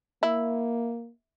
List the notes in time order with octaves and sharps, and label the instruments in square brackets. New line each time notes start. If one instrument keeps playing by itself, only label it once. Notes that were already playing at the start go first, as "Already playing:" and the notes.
[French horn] A#3 [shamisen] E4